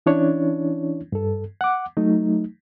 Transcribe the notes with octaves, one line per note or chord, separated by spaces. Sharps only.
E3 C#4 D4 E4 C#5
G2 A4
F#5 D6
F#3 A3 D#4